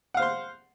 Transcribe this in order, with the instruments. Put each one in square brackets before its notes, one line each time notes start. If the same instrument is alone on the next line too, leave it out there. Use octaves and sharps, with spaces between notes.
[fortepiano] F#5
F5
C5
C6